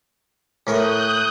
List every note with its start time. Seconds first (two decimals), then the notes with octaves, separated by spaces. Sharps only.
0.67 A2 A#4 C#5 D#6 F#6 G6